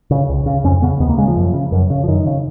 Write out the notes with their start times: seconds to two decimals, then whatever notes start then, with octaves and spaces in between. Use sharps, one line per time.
0.11 C#3
0.29 C#2
0.46 C#3
0.64 F2 C#4
0.82 C#3 B3
1.00 D#2 B3
1.09 A#3
1.18 C#3 G#3
1.28 F3
1.36 F#2
1.54 C#3
1.72 F#2
1.90 C#3
2.04 F3
2.08 F#2 D#3
2.26 C#3